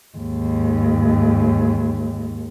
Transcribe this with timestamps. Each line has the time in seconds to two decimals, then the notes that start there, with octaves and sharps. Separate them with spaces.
0.18 D#2 G#2